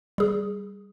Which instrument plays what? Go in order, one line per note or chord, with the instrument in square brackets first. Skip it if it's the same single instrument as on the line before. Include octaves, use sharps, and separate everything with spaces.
[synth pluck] G3 G#4